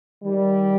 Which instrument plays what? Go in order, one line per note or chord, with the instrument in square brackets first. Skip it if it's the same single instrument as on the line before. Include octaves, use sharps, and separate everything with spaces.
[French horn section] D#3 G3